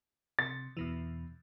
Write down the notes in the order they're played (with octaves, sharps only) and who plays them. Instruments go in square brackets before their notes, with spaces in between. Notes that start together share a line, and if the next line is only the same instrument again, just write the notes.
[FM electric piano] C3 [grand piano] A6
[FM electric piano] E2 B2 E3